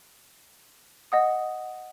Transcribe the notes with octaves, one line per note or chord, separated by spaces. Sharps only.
D#5 F#5 D#6